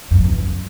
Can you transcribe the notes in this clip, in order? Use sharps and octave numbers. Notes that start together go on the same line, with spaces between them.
F#2
E2
F#2